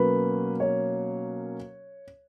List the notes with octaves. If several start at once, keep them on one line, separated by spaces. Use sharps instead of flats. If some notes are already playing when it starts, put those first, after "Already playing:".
Already playing: B2 F#3 A#3 C#4 B4
C#5